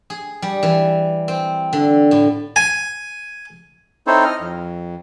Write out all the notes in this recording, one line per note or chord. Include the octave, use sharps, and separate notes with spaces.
G#4
G3
E3
C4
D3
A2
G#5
C4 D#4 E4 A4 C5 C#5
D#5 F6
F2